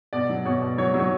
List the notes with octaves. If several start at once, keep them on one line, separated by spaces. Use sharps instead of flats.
B2 D5
F#3
B2 C#5
B2
F#3 C#5
F#3
C#5